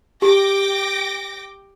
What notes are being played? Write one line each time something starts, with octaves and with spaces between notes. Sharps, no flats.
G4 G5 D6 A#6